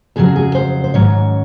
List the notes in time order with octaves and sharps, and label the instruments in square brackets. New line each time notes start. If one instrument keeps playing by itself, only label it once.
[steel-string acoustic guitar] F2 C#3 F#3 G#4
G#4
C5
C5
G#2 D#3 F#3 C#4 C#5